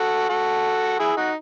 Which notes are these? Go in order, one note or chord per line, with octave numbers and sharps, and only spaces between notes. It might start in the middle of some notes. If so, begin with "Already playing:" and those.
Already playing: F#4 A4
F#4 A4
E4 G#4
D#4 F#4